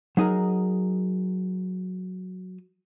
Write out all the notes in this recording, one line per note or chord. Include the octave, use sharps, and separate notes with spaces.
F#3 D#4 G#4 A#4